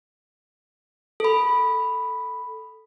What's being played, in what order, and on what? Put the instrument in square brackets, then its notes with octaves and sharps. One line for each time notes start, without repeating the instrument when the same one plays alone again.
[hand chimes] A4 B5